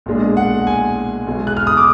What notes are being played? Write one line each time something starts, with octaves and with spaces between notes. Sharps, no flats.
B1 A#2 G#3 D4
F#5
G#5
B1 B2 G#3
F#6
F6
D#6
D6